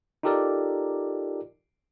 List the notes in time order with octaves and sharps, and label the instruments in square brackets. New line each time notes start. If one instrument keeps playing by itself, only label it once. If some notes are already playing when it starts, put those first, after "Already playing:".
[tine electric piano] D#4 F4 G4 A4 A#4 D5